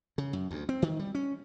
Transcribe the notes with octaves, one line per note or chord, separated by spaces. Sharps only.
C#3
F#2
D2
C4
D#3
G3
C#4